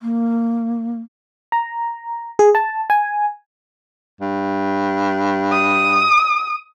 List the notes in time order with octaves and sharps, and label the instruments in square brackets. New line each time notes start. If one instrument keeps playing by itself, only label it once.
[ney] A#3
[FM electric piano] A#5
G#4
A5
G#5
[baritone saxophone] G2
[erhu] D#6